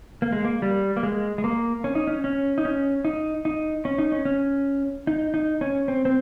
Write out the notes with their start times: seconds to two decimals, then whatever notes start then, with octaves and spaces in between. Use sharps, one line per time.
0.22 A#3
0.33 G#3
0.45 A#3
0.62 G3
0.97 A#3
1.03 G#3
1.38 G#3
1.44 A#3
1.84 C#4
1.95 D#4
2.07 C#4
2.24 C#4
2.58 D#4
2.65 C#4
3.05 D#4
3.45 D#4
3.85 C#4
3.98 D#4
4.12 C#4
4.25 C#4
5.07 D#4
5.34 D#4
5.61 C#4
5.88 C4
6.05 C4